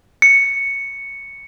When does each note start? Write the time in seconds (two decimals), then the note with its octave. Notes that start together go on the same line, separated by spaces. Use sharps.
0.22 C#7